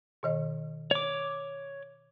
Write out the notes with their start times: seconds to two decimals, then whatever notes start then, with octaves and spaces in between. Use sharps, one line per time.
0.23 B2 D#3 D#5
0.91 C#5 D6